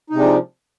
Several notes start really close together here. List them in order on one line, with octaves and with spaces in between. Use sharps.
D#4 C3 G#3 D4 F3